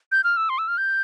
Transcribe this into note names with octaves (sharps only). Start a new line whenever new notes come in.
G6
F6
E6
C6
E6
F6
G6